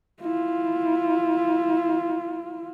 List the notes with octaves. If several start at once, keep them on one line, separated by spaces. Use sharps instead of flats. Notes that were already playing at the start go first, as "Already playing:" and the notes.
E4 F4